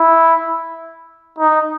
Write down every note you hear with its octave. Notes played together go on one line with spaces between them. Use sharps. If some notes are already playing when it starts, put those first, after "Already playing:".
Already playing: E4
D#4